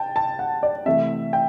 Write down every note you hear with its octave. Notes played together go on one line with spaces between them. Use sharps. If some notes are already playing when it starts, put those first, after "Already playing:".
Already playing: G5 A5
A5
F#5
D5
C3 E3 A3 E5
G5